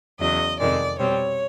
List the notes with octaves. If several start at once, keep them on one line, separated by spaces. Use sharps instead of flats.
E2 C#3 F#3 D#5
F2 C3 D#3 G#3 D5
B2 G3 C4 C#5